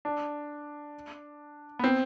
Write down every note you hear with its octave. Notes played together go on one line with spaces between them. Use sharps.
D4
B3
C4